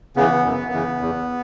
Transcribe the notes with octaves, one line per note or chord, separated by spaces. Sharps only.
C#3 E3 B3
F#2
C#3 E3
E2